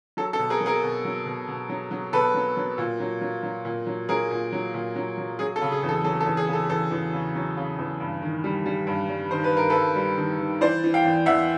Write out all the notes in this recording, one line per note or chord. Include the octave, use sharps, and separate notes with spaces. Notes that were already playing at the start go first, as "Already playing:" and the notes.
F#3 A4
A4
B2
G#4 A#4
F#3
G#4 A#4
B2
F#3
B2
B2
F#3
F#3
B2 A4 B4
F#3
F#3
A#2
F#3
F#3
F#3
A#2
F#3
F#3 G#4 A#4
A#2
F#3
A#2
F#3
F#3
F#3 G#4
A4
C#3
G#4
E2
A4
F#3 A4
A4
E2
G#4
C#3 A4
E2 A4
E2
C#3
F#3
C#3
E2
G2
D#3
G3
G3
G2
G3
D#3 C5
B4
G2 A#4
A4 B4
G2
G3
D#3
D#3
E3 C5 D5
E3
F5 G5
E2
E2 E5 F#5